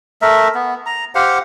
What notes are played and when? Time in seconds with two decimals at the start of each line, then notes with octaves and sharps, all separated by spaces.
0.22 A3 A#4 E5
0.55 B3
0.86 A#5
1.15 G4 C5 F5 F#5